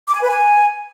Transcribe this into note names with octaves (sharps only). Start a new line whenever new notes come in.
D6
G#5
B4
G#5